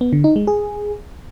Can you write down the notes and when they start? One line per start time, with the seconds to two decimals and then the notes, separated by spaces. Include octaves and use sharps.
0.01 B3
0.13 D3
0.24 D#4
0.36 G#3
0.47 G#4